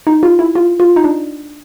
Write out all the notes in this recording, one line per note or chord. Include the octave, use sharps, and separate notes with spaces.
D#4
F4
E4
F4
F4
D#4
D4